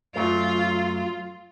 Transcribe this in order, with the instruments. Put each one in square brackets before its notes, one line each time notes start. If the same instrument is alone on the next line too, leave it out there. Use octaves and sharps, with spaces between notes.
[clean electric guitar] F#2 F#3 A3 [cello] F4